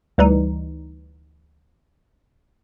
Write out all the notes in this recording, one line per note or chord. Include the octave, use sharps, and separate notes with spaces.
D2 E3 G3 D#4